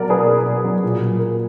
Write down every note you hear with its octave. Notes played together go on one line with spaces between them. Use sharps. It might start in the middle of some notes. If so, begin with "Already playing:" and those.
Already playing: B2 F#3 A#4 D5
A#3 G#4 B4
B2
B2
F#3
A#2
F#3
A#3